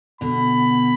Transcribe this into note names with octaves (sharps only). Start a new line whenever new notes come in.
B2 D3 B5